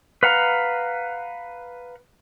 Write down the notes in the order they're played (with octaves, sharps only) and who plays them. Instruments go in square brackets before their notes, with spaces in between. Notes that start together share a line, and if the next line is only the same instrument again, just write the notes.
[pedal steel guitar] B4 F5 F#5 A#5